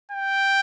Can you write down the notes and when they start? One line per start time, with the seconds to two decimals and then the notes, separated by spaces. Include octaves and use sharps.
0.11 G5